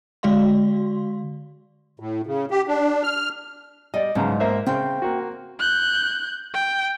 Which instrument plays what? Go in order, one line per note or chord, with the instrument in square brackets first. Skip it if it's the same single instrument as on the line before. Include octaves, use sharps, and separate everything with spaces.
[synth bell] D3 G#3 F#4 D5 F5 C6
[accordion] A2
C#3
G4
D4
F6
[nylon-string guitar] G3 [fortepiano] D5 D#5
[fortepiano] B1 C#3 A#5 [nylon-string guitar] G#2
[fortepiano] A#3 C5 E5
[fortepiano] C#3 [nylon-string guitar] C4 G5
[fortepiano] A#3 F#4
[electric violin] F#6 G6
G5